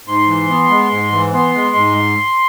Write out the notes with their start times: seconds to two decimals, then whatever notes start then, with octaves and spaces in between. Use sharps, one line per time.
0.07 G#2 C6
0.28 E3
0.50 B3
0.70 G#3
0.92 G#2
1.12 E3
1.33 B3 C6
1.55 G#3
1.75 G#2